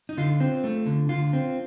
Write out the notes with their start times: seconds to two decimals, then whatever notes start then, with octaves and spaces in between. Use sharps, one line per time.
0.09 D#4
0.17 D3 F4
0.40 C4
0.64 A3
0.87 D3
1.09 D3 F4
1.33 C4